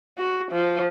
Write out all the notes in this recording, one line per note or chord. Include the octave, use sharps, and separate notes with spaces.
F#4
F3